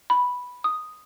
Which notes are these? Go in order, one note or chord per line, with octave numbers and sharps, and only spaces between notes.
B5
D#6